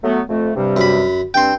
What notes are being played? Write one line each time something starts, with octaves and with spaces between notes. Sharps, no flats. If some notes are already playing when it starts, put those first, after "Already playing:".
F#3 A3 B3
F2 A3
G2 C3 G3
F#2 B5
G2 C4 G5 C6